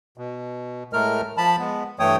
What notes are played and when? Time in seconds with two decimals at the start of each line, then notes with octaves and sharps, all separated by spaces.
0.18 B2
0.93 A2 G#3 A3 A#4 F6
1.37 F3 A5 B5
1.59 G#3 B3
1.99 G2 E3 A3 C#5 G5 D#6